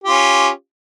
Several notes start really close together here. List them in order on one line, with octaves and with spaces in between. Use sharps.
G4 F4 C#4